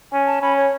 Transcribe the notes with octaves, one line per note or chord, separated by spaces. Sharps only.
C#4 G#5
A5
C#4 B5
C#5